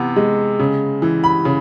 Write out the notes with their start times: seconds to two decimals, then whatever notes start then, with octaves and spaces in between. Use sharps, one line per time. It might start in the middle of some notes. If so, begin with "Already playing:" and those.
Already playing: C3 E3 B3
0.16 G#3
0.59 C#3
1.02 E3
1.24 B5
1.45 C#3